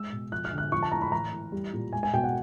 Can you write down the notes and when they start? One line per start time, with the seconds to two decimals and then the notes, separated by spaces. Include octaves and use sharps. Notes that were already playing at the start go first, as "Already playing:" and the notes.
Already playing: G#3 E6
0.12 B2
0.32 F3 F#6
0.45 F6
0.52 D3
0.58 F#6
0.72 F3 C#6
0.83 A5
0.92 A2 A#5
1.02 B5
1.12 E3 A#5
1.32 A2
1.52 G3
1.73 A#2
1.93 G#3 G#5
2.03 G#5
2.13 B2 G5
2.24 F#5